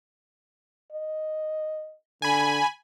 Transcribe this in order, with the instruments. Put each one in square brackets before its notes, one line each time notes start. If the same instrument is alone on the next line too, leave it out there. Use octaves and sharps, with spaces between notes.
[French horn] D#5
[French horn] D3 [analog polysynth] G#5 B5